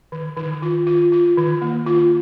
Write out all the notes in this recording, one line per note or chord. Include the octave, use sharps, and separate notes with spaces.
D#3
D#3
F4
F4
F4
D#3
A#3
F4